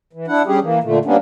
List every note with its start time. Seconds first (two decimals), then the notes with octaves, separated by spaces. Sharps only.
0.13 E3
0.28 D4 E4 F#5
0.46 G3 C#4 G4 G#4
0.62 E3 A#3
0.84 A#2 D3 A3
1.05 G3 A#3 B3 C#4 D4